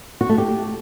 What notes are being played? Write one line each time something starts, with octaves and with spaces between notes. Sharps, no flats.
F#4
A3
G4